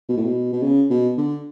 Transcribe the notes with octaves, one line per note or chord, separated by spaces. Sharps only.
B2
A2
B2
B2
C#3
B2
D3